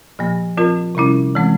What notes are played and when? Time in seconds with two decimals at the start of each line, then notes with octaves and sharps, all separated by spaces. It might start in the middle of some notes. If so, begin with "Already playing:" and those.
0.19 A#2 F3 A#3
0.57 F3 C4 F4 A#4
0.95 C3 G3 C#4 E4
1.35 E3 G#3 C4